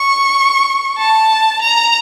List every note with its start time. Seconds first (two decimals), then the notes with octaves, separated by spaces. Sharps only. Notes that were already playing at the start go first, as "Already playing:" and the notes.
Already playing: C#6
0.98 A5
1.62 A#5